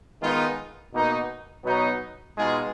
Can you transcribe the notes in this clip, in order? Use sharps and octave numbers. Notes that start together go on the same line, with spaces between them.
D#3 G#3 B3 D#4 F4
B2 A#3 D#4
B2 F#3 B3 D#4
B2 G#3 D#4 F4 G#4